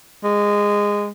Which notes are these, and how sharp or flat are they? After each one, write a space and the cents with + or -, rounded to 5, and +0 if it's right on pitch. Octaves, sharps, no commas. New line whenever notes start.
G#3 -15